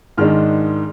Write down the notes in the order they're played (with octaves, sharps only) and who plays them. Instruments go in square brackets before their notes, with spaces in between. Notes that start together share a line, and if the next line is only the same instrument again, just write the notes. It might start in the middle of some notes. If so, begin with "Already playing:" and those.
[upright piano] G#2 D#3 G#3 D4 F6